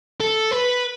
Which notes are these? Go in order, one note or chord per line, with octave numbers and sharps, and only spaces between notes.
A4
B4